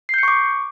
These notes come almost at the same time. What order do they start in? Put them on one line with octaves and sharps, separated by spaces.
C7 G6 C#7 C#6 D6